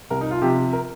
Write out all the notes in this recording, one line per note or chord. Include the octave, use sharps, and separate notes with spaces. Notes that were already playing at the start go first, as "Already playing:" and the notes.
C2 A#4
D#4
F4
C3 F3 G4
A#4